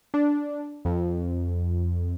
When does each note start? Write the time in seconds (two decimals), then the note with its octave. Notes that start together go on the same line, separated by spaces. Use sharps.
0.14 D4
0.85 F2